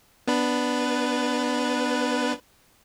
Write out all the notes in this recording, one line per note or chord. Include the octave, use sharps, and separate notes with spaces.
B3 D4 B4